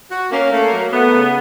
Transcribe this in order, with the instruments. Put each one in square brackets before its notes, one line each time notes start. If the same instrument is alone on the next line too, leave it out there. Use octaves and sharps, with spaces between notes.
[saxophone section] F#4
[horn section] A#3 [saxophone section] C#4
[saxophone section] A3
F#3
[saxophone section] A3 [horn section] B3
[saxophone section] C#3